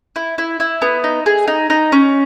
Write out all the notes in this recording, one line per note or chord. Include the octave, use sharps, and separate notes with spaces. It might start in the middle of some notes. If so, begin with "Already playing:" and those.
E4
E4
E4
B3
D#4
G#4
D#4
D#4
C#4